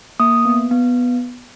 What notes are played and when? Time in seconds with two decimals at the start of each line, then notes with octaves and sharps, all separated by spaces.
0.20 A#3 D#6
0.45 B3
0.71 B3